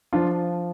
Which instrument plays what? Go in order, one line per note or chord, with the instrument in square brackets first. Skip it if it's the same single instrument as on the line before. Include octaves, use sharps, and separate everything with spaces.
[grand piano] F3 D4 F4